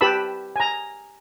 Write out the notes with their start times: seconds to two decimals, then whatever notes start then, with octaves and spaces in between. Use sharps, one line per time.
0.01 G4 B4 A5 B5 E6
0.56 G#5 A#5